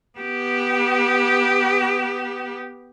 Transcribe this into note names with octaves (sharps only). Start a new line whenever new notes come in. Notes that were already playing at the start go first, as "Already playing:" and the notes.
B3 G4